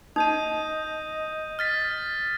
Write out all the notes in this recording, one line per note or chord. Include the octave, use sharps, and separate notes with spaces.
D#4 D#5 D#6 G6 D#7
F6 A6 B6